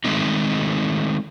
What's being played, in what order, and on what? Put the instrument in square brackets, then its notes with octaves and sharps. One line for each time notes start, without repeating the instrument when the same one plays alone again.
[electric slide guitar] D#3 G#3 A3 C4 D#4